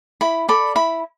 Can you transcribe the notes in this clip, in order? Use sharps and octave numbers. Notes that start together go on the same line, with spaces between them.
E4 B5
A4 D5 B5
E4 B5